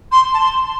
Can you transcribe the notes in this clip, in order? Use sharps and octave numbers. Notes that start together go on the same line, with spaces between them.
C6
A5
C6